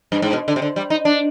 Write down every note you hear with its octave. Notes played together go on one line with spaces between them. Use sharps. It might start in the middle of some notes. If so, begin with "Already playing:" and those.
G2
G#2
B2
D3
C3
D3
G3
D#4
D4